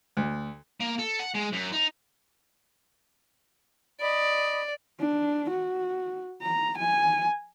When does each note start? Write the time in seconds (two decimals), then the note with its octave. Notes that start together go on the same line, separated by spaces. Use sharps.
0.17 D2
0.80 A#3
0.99 A4
1.20 F#5
1.35 G#3
1.53 F#2
1.73 D#4
4.00 D5 D#5 B5 D#6
5.00 D4
5.50 F#4
6.42 A#5
6.78 G#5